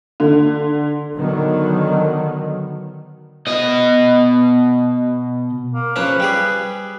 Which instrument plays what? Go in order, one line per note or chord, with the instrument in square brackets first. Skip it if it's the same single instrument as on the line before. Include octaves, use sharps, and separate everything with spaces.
[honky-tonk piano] D3
[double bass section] D3 D#3 F#3 B3
[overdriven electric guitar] B2 D#5
[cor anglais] A#3
[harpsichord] C#3 F3 C#4 [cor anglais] B4
[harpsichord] G3 G4 G#4